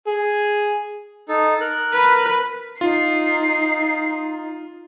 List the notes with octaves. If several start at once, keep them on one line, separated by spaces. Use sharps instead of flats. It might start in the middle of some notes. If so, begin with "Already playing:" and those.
G#4
D#4 A4
A#4 F#6
B4
D#4 F4 C7